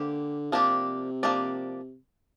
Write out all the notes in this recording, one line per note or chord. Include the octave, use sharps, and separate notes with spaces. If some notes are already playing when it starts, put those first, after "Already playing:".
Already playing: D3 A#3 G4 C5
C3 F3 A#3 D4 G4 D5
F3 A#3 D4 G4 D5